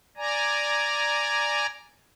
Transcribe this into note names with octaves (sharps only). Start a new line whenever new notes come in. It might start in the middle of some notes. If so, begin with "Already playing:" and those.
D5 G#5 A#5